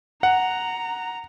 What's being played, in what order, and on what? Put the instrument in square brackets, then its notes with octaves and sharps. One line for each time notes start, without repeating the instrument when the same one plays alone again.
[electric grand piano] F#5 [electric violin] A#5